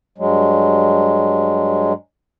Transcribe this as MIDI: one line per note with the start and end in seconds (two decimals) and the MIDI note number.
0.18 1.93 43
0.18 1.93 54
0.18 1.93 56